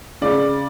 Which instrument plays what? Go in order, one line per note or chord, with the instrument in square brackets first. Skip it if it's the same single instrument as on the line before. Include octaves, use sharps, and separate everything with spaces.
[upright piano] C#3 D5